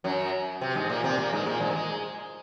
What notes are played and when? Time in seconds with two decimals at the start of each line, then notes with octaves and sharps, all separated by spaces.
0.04 F#2 F#3
0.61 C3 C4
0.75 G#2 G#3
0.90 A#2 A#3
1.04 C3 C4
1.18 A#2 A#3
1.33 G#2 G#3
1.46 A#2 A#3
1.60 G#2 G#3
1.70 A#3
1.76 G#3